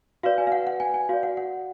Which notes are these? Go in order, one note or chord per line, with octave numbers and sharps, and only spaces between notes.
F#4 B4 D5 F5
G#5
F5
F#5
F#5
G#5
G#5
F#4 D5 F5
F#5
F#5